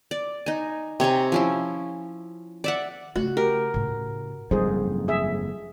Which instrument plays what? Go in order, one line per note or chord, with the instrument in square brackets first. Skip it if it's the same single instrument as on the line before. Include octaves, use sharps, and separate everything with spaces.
[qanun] D5
D#4 G#5
C3 C#5 G#5 A#5
F3 C#4 E4
D5 E5 F#5
[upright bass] C#3 A3 [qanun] F#4
[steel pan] G4 [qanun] A#4
[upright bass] A2 C#3
[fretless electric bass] F#1 F2 G#2 [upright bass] G3 [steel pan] G#4 C5
[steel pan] G#4 E5